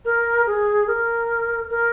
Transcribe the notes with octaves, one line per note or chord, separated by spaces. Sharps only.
A#4
G#4
A#4
A#4